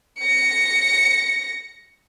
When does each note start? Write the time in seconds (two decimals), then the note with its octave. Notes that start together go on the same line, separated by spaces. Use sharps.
0.20 A#6 C#7